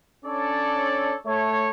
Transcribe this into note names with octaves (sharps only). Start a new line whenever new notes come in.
C#4 D4 A4 C#5 D5
A3 C#5